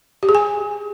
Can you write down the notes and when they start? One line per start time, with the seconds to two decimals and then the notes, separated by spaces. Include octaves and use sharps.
0.23 G4
0.29 G#4
0.35 G#5